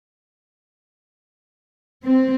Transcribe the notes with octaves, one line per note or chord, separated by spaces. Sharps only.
C4